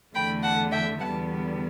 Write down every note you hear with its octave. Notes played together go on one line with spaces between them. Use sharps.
E2 D3 A3 G5 B5
F#5 A5
E5 G5
E2 D3 G3 B3 F#5 A5